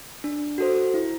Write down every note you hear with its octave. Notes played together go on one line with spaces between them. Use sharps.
D4
F#4 A4 C5
E4